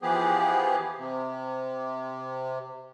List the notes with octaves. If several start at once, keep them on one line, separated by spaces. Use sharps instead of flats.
E3 F3 B3 G4 G#4
C3